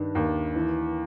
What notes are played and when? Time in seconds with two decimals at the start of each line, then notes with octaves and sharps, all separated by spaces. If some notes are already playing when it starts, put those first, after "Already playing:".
Already playing: G2 D#3
0.15 D#2
0.56 E3